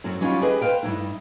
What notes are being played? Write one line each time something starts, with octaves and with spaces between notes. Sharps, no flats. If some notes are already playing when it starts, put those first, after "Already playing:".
F#2 F#3 C4
F#3 G3 C#4 D#4 F4
G4 G#4 B4 D#5
B4 C5 F5 G5
G2 D#3 D#4 E4